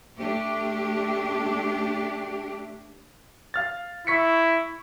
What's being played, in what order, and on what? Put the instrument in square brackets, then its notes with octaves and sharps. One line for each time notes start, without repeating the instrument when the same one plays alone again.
[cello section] A3 D4 G4
[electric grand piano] F5 F6 A6
[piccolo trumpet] E4 [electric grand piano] C#6 B6 C#7